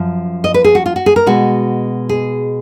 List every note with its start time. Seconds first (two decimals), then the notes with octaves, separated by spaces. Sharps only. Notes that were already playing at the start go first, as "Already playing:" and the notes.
Already playing: F#2 F3
0.44 D#5
0.54 B4
0.64 G#4
0.75 F#4
0.86 F4
0.96 F#4
1.06 G#4
1.16 A#4
1.26 B2 G#3 F#4
2.09 G#4